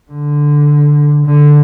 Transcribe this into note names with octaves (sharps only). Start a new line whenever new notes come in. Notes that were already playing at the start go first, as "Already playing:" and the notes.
D3
D3